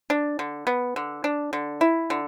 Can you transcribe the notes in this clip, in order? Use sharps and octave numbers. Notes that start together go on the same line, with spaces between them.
D4
D3
B3
D3
D4
D3
E4
D3